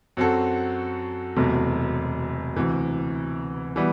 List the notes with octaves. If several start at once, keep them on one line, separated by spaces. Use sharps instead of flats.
F#2 F#3 C4 F#4 A4
E1 E2 C3 F#3 A3
D2 C3 E3
E3 G3 B3